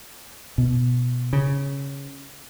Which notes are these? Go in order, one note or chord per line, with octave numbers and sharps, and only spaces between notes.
B2
C#3